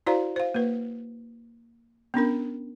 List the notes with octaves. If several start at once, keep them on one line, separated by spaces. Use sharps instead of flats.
E4 F#4 C5 D5 F5 A#5
C5 F5
A#3 B4
B3 C#4 D4 A#4